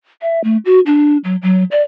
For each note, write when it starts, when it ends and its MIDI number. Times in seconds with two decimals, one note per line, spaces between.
0.22 0.42 76
0.44 0.57 57
0.65 0.80 66
0.86 1.17 62
1.24 1.36 54
1.42 1.64 54
1.71 1.82 74